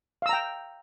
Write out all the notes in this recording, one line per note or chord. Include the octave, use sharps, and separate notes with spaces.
F5 G5 A#5 E6